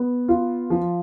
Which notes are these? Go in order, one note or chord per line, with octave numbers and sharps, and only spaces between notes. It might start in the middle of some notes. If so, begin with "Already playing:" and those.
Already playing: B3
F4
F3